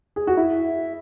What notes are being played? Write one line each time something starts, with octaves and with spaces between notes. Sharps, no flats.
G#4
F#4
E4 E5